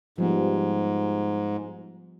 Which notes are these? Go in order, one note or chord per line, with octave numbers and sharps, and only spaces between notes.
G#2 F3 G3 B3